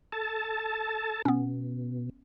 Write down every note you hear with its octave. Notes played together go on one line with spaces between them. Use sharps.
A4 A5
B2 B3 C#4